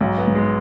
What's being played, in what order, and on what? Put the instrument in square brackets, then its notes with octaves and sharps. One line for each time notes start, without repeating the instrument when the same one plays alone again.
[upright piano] B1 [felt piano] G#2
[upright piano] B3
[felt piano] G#2
[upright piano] G#3